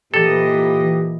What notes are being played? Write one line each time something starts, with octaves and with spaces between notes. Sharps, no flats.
A#2 E3 G4 A4 D#5